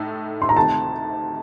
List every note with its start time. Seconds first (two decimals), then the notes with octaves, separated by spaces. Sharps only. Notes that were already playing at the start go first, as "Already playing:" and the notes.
Already playing: A2 A3 D#4 A4
0.42 C6
0.49 A#5
0.57 D2 C3 D#3 A3 A5